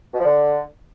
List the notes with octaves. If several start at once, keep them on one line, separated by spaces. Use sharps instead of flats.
B2
F3
D3